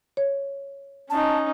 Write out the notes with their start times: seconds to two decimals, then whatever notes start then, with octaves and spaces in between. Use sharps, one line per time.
0.17 C#5
1.10 C#4 D#4 A5